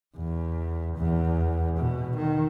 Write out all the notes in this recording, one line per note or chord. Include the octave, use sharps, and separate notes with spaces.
E2
E2
B2
D#3